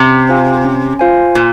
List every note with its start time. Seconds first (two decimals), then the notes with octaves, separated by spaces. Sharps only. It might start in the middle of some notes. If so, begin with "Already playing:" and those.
Already playing: C3 C#4
0.29 F4 C5 F5 G#5
0.65 C#4
0.99 F4 C5 F5 G#5
1.35 A#2 F4